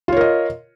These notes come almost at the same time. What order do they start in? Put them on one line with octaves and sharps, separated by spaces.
F4 C#5 A#4 D#5